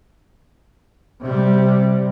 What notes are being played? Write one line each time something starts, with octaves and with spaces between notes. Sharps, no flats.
C3 G3